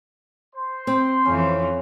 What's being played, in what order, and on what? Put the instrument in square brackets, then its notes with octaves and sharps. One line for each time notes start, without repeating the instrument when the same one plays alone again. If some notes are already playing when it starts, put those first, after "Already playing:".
[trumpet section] C5 C6
[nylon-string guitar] C4
[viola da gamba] F2 E3 [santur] C#4